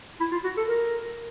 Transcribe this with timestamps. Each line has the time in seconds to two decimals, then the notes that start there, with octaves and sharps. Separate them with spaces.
0.20 E4
0.32 F4
0.44 F#4
0.57 A4
0.68 A#4